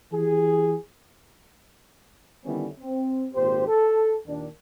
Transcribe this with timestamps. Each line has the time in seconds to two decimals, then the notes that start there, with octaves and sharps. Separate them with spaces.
0.13 E3 G4 G#4
2.45 D3 D#3 G3 B3 C#4 E4
2.79 C4
3.34 G#1 A#2 G4 C5
3.68 A4
4.27 D#2 A#2 D#3 D4